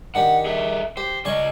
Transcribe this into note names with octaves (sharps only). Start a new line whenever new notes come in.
D#3 D4 G4 F#5
G#4 A4 E5
G4 C5
C#3 D5 D#5 G#5 C#6